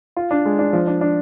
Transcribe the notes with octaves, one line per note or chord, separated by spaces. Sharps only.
F4
D4
G#3
D4
F3
D4
D4